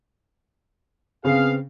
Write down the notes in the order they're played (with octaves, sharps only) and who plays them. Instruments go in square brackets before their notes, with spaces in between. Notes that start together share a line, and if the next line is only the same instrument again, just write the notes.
[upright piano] C#3 [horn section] B3 G#4 F5 [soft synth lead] C4